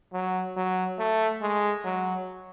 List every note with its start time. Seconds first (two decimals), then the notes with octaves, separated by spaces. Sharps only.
0.13 F#3
0.57 F#3
0.99 A3
1.42 G#3
1.85 F#3